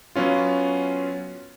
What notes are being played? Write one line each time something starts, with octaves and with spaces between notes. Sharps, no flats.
F#3 B3 C#4 F4